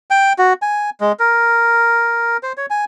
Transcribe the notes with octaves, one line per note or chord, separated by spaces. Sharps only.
G5
F#4
G#5
G#3
A#4
C5
C#5
G#5